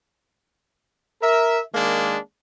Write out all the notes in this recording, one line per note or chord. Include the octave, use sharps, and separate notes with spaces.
A#4 E5
D#3 G#3 A#3 D4